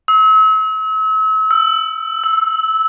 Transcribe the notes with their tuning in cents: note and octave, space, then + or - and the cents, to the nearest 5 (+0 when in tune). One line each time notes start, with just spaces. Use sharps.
E6 -40
E6 +15
E6 -15